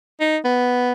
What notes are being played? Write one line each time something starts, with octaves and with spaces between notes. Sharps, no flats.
D#4
B3